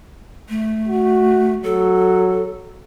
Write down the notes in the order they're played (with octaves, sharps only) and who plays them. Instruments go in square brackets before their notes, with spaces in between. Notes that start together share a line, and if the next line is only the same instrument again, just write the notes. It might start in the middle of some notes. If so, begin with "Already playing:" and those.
[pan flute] A3
[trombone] F#4
[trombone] F#3 [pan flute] A4